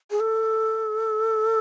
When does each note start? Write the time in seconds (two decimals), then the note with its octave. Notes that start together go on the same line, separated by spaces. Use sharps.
0.11 G#4
0.20 A4